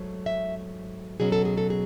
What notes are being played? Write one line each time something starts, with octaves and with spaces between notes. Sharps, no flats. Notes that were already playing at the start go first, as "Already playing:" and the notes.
Already playing: G#2 F#3 A3
E5
B2 F#3 C#4 G#4
A4
G#4
A4
G#4